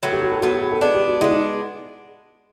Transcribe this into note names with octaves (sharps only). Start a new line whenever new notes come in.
A2 F#3 B3
G4
F#4
A4
A2 F#3 B3 F#4
G4
G#4
A4
G#3 B3 D4 G#4
G4
F#4
G#3 B3 D4 E4
D#4